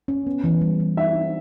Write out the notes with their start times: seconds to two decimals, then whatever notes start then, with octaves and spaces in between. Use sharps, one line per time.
0.08 C#4
0.27 B3
0.44 E3
0.61 G3
0.80 G3
0.97 D4 E5
1.15 G3